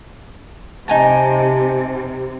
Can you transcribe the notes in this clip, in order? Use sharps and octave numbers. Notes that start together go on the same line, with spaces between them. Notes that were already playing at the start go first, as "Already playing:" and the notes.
C3 D#4 G#5 A5